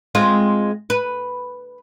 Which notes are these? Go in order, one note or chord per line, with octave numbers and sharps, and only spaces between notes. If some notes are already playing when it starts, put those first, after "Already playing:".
G#3 C4 F4
B4